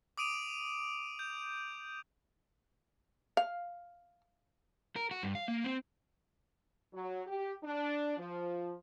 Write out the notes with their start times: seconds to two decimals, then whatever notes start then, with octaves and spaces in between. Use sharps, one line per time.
0.18 D6 D#6 D7 D#7 F7
1.19 G6
3.37 F5
4.96 A#4
5.11 F#4
5.23 G2
5.35 F5
5.48 A#3
5.64 C4
6.93 F#3
7.27 G4
7.63 D4
8.17 F3